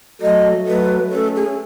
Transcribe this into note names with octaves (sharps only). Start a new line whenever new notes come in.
F#3 A3 D#5
F#3 A3 B4
A3 C#4 A4
G#4